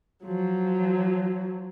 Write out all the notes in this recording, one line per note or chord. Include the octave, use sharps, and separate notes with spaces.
F3 F#3